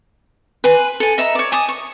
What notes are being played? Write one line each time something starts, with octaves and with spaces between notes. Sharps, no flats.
B4 G#5 C6
A4 G#5
D#5 E5 A#5 B5
C#5 D5
G#5 A5 D6 D#6
C#6